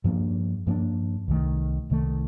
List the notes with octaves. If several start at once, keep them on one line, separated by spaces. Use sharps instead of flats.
G2 F3 A#3 D4
G2 F3 A#3 D4
C2 C3 D#3 A3
C2 C3 D#3 A3